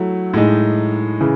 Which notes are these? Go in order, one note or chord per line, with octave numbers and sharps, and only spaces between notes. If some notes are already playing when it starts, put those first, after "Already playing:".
Already playing: F#3 A3 E4
A2 G#3 D#4
C#3 E3